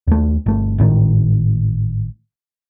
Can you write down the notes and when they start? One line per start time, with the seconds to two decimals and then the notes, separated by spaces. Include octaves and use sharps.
0.07 D#2 A3
0.46 G1 A3
0.78 G#1 A2 C3 D#3